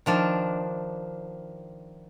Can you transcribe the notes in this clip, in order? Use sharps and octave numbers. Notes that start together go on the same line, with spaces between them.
D#3 F3 D4